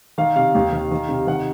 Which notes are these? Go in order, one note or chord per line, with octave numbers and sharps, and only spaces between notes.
D#3 F5
C3 F5
D#2
D#3
D#3
C3
D#3 F#5